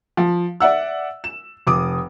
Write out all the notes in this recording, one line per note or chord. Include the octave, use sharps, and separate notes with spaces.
F3
D5 E5 F#5 E6
E7
F1 D6 D#6